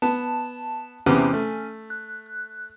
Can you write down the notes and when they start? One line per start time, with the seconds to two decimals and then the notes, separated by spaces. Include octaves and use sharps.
0.02 B3 A5
1.06 E2 C3 B3 C#4
1.33 A3
1.90 F#6
2.26 F#6